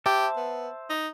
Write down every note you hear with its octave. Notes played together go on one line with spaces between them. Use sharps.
G4 C5 E5 A5
B3
D#4